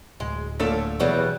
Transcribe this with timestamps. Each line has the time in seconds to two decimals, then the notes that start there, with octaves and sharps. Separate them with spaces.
0.20 D1 G#3
0.60 A#2 D3 A3 A4 C#5 F5
1.00 E2 B2 F#3 G3